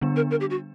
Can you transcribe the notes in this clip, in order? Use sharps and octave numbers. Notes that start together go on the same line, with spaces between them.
D3 G3 B3 D4
A#4
A#4
G4
F#4